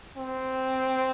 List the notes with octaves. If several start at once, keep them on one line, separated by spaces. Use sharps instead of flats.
C4